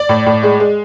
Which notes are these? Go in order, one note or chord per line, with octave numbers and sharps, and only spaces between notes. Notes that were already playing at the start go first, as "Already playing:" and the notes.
Already playing: D5
A2
A2
G#3
G#3